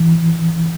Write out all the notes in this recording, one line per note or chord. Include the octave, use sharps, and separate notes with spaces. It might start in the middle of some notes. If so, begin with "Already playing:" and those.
Already playing: E3